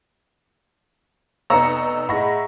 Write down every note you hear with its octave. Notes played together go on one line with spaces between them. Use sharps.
F1 B3 D#4 A#5 C#6 E6 C#7
A2 G#4 D#5 F#5 B5 C#6 A#6